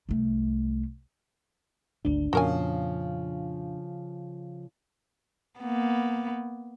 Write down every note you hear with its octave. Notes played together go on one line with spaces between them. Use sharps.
C2 A3
G#1 D2 D4
F2 A#2 C#3 F3 F#4 A#4 G#5
A#3 B3